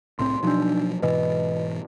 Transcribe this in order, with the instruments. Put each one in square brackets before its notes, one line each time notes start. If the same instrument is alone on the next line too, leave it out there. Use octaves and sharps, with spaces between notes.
[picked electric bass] C2 A2 C4 [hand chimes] C6
[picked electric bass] B2 F3 F#3 [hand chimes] D4 D#4
[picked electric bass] G#2 B2 E3 [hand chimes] B4 D#5